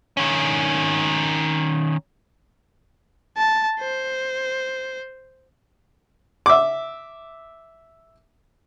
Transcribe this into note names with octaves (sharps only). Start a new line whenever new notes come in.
D#3 C#4
A5
C5
E5 D6